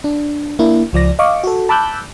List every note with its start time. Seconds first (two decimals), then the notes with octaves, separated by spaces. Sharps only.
0.04 D4
0.59 A#3 D4 E4
0.93 C#2 F3 D5 A#6
1.19 D#5 F5 C#6 D6
1.44 F#4 A4
1.69 A5 B5 D6 E6 F#6 G6